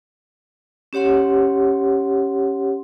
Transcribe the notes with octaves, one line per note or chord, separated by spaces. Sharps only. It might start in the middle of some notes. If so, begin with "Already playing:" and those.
C#4 G4 C#5 F#5 C6